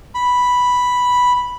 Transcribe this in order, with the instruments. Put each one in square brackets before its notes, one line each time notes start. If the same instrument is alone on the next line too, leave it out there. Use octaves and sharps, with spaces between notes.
[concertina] B5